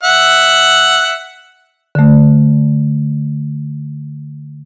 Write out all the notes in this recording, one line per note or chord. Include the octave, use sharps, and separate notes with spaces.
E5 F#5
D3 A3